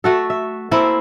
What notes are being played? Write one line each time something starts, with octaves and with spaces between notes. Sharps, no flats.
A3 F#4 A4
E5
A3 A#3 C4 E4